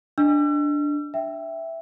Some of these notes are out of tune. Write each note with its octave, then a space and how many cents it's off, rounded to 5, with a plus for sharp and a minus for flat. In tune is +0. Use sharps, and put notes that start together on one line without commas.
D4 +0 D#5 +0 E6 +40
E5 +0 G5 +0